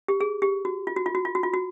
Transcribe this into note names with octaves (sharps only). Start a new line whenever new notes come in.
G4
G#4
G4
F#4
F4
F#4
F4
F#4
F4
F#4
F4
F#4